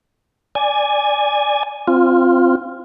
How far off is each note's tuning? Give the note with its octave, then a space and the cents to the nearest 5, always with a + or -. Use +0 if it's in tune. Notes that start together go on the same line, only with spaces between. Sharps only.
D5 +0 G#5 +0
C4 +0 F4 +0